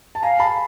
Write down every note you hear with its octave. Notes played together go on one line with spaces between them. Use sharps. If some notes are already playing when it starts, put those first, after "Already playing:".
A5
F5 G#5 A#5
A5 B5